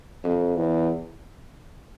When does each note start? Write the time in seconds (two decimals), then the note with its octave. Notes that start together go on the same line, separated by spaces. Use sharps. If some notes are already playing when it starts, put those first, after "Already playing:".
0.24 F2
0.56 E2